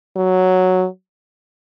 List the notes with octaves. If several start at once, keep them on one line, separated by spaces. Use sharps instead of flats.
F#3